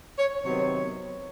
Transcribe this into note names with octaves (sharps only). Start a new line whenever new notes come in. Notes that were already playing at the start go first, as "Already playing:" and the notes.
C#5
C3 D#3 F#3 B3 C#5